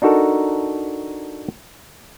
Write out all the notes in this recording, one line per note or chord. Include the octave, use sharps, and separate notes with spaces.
D4 D#4 F#4 A4 A#4